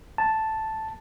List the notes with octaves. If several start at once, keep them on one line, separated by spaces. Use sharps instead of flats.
A5